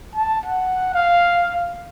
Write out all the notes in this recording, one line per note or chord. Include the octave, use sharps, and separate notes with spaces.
A5
F#5
F5